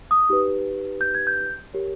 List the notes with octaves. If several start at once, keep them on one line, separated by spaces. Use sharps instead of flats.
D#6
D#4 G4 B4
G6
G#6
G6
G4 A#4 C#5